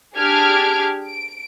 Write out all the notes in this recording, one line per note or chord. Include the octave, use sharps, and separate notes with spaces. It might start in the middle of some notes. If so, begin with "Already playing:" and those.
D4 G4 G#4 F6 G#6 D7
D7